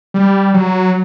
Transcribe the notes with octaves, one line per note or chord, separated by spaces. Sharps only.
G3
F#3